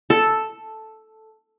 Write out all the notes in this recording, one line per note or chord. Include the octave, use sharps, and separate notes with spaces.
A4